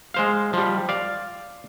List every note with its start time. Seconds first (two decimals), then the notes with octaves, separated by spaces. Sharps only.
0.14 G#3 C5 F5
0.53 F3 G3
0.89 D5 F5